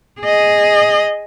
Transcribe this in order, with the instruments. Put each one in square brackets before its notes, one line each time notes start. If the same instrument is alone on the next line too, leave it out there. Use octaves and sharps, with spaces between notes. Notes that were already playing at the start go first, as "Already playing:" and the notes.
[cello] G#4 D#5